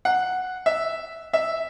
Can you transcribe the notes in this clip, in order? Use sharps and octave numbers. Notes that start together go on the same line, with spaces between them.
F#5
E5
E5